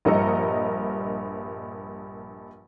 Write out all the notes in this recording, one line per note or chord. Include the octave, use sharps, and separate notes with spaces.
A#1 G2 A#4 D#5 E6 C#7